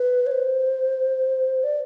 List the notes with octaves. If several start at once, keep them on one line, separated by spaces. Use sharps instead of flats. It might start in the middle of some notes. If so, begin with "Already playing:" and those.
Already playing: B4
C#5
C5
D5